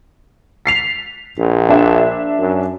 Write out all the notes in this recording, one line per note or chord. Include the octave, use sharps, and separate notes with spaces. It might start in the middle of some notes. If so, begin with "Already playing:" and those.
B6 C7 F7
A#1
D4 E5
F#2